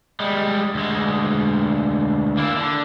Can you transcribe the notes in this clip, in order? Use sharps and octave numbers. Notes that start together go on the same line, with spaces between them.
G3 G#3
D2 G#3
A#3 E4
D3